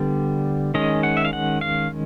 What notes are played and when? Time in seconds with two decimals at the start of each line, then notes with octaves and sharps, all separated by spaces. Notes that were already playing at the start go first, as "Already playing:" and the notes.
Already playing: D3 G3 B3 D5
0.74 D#3 G#3 C#4 D#5
1.03 F#5
1.17 E5
1.25 F5
1.33 F#5
1.61 F5